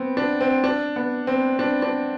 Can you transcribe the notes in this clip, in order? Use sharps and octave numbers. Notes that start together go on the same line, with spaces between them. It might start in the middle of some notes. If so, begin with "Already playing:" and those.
Already playing: B3 C4
D4
C4
D4
B3
C4
D4
D4